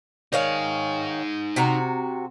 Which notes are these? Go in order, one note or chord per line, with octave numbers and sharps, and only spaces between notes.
D#3 D#4 G#4 C#5 F5
C3 F#4 A#5